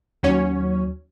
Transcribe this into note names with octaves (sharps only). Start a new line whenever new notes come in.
D#2 F#3 C#4 C#5